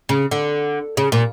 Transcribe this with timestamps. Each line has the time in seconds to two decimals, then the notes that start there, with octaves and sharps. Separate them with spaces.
0.09 C#3
0.31 D3
0.97 C#3
1.12 A#2